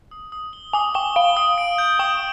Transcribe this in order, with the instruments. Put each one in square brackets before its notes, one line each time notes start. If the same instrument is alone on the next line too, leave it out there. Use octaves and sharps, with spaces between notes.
[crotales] D#6
D#6
G7
[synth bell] G#5 [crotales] D#6
[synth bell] G5 [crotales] G7
[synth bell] F5 [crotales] G7
[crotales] D#6
D7
G6
[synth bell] G5 [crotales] D#6